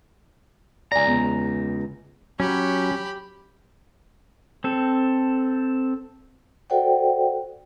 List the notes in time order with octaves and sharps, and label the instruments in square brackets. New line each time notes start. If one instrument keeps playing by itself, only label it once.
[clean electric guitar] C#2 A#5 [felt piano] D5 G#5
[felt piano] E2
[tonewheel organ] F#3 [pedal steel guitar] C#4 [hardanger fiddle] G4 B5
[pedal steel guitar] C4 A4
[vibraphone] F#4 A4 C5 D5 F#5 G5